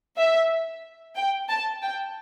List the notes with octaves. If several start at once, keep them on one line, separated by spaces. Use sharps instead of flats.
E5
G5
A5
G5